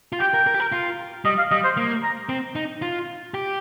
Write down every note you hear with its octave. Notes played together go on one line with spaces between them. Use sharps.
F4
G4 G5
A#4
A#4
G4
A#4
F4
G3 D#5
F5
G3 D#5
C5
A#3
A#5
C4
D#4
F4
G4